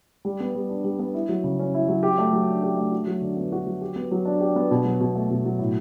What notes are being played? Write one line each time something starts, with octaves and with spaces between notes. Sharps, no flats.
G3
B3
G3
D4
G3
B3
E4
F#3
C#3
C#4
E4
F#3
G4
A3
F#3
D4
G4
A3
F#4
F#3
D3
B3
F#4
F#3
G4
B3
F#3
D4
G4
B3
B2
F#3
B2
A3
B2
F#3
A2